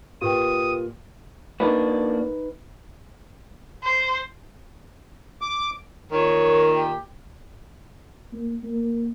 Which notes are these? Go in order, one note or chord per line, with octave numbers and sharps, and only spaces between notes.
A#2 G4 B4 G5 D#6
A#3 D4 D#4 F#4 B4
C5
D6
A#2 D#3 C#5
G4
A#3
A#3